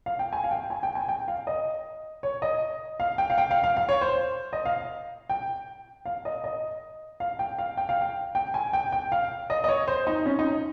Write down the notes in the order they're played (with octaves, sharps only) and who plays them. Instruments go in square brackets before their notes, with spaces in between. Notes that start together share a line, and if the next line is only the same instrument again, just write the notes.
[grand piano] F5
G5
G#5
F5
G5
G#5
G5
G#5
G5
F5
D#5
C#5
D#5
F5
G5
F5
G5
F5
F5
F5
C#5
C5
D#5
F5
G5
F5
D#5
D#5
F5
G5
F5
G5
F5
G5
G5
G#5
G5
G5
F5
D#5
D#5
C#5
C5
D#4
C#4
D#4